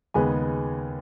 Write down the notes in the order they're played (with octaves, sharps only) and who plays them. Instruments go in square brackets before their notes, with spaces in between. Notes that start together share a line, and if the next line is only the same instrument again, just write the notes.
[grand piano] D#2 C#3 G#3 B3 G#5